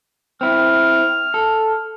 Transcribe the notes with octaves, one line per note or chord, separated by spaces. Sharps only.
C4 E4 F6
A4